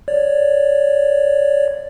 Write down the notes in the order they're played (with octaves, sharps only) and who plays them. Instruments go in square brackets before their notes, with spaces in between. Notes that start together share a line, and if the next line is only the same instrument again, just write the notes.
[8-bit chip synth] C#5 D5